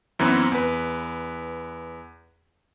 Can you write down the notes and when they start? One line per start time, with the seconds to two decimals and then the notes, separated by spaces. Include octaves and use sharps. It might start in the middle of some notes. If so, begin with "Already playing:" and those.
0.19 F#2 E3 B3 C4
0.52 E2 B4